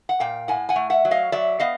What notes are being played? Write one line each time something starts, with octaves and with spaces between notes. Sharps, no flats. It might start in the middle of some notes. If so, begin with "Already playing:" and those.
F#5
A#2 F5 G5
A2 F#5 G#5
F#5 G#5
A3
E5 F#5
F#3
D#5 F5
F#3 D5 E5
B3 D#5 F5